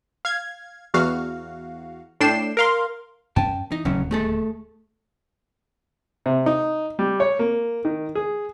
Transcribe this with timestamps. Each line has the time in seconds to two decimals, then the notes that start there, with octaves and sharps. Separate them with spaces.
0.25 F5 G#6
0.94 E2 F#4 F5
2.20 A2 D4 G5 C7 E7
2.57 A#4 F5 C6
3.36 F#2 C#4 G5 A5
3.72 E3 D#4
3.85 D1 D#2 C#3 F#3 C#4
4.11 A3 G#4 A4
6.26 C3
6.46 D#4
6.99 G3
7.20 C#5
7.39 A#3
7.85 D#3
8.15 G#4